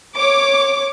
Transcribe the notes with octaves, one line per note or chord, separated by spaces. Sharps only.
C#5 D6